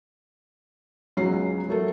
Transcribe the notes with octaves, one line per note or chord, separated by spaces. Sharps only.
C#2 F#3 G#3 A#5 C7
F#3 A3 A4 A#4